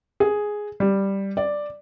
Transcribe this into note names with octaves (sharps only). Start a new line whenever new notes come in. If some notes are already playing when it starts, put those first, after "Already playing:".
G#4
G3
D5